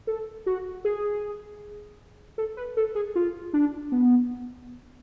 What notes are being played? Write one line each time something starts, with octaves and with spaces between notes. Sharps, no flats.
A4
F#4
G#4
A4
B4
A4
G#4
F4
D4
B3